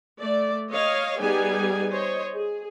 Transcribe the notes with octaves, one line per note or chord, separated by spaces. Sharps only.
A3 D5
C#5 D#5 F5
G3 B3 D#4 G4 G#4 G#5
C5 C#5 D#5
G#4